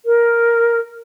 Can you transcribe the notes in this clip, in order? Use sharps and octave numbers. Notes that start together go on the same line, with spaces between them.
A#4